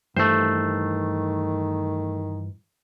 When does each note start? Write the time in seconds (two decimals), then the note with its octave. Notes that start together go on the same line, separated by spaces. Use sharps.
0.17 G2 D#3 E3 A3 C5